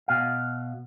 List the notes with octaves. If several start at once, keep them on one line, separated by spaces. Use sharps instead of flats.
B2 F5